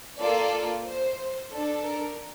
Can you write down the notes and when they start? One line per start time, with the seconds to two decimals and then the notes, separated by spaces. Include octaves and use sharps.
0.20 A#3 F4 A4 D5
0.87 C5
1.52 D4 A4
1.85 A#4